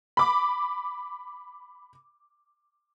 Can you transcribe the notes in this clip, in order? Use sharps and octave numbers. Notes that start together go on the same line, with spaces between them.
B5 D6